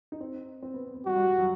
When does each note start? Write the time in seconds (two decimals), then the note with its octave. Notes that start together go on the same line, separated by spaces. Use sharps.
0.12 D#4
0.21 C4
0.63 C4
0.74 B3
0.95 B3
1.06 G3 F#4
1.16 G3
1.27 G3
1.38 F#3